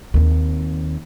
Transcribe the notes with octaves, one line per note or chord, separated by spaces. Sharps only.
D#2 C4